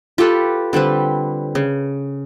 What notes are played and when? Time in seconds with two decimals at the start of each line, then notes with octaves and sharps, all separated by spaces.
0.18 F4 G4 A4 B4
0.73 D3 G3 C4 B4
1.55 C#3